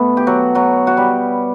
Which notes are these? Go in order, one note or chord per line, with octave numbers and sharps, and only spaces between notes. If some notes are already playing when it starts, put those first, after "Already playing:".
Already playing: B2 A3 B3
G4
F#3 F#4
F#3 F#4
F#4
G3 G4